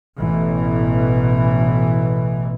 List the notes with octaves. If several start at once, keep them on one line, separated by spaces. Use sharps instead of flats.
A1 B2 E3